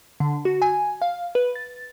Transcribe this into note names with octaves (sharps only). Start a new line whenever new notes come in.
D3
F#4
G#5
F5
B4
A6